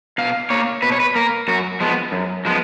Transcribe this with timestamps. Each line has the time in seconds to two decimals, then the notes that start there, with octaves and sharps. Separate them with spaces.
0.18 B2 F5
0.50 A#3 C#5
0.82 B2 B4
0.92 C#5
1.00 B4
1.15 A#3 A#4
1.48 F#2 F#4
1.81 F3 G#3 B3
2.12 F#2
2.45 F3 G#3 B3